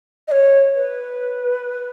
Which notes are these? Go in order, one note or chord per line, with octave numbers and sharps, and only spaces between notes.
D#5
C#5
B4